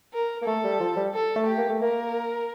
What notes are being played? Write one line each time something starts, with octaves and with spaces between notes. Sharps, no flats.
A#4
A#3
A3 A4
G3
F3
G3
A4
A3
G4
A#3
A3
A#3 A#4